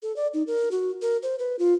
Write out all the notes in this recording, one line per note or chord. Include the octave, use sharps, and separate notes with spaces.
A4
D5
D#4
A#4
F#4
A#4
C5
B4
F4